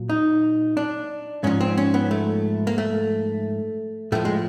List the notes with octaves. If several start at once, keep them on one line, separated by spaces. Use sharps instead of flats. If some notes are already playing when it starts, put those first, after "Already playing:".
Already playing: A#2 F#3
D#4
D4
G#2 F3 C#4
C4
C#4
B3
A3
A#3
A3
A2 F3 A3
G#3